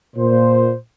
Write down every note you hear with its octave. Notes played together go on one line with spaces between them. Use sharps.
A#2 C5